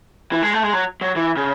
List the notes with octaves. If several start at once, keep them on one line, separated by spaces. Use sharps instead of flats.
E3
G#3
A3
G#3
F#3
F#3
E3
C#3